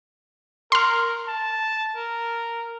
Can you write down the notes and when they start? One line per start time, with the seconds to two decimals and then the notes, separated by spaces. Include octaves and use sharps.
0.72 A#4 C6 F6
1.28 A5
1.96 A#4